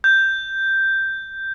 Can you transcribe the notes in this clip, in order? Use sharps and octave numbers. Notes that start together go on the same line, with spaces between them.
G6